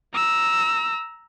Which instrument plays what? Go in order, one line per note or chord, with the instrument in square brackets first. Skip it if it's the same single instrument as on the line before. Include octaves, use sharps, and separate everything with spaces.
[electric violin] A#5 E6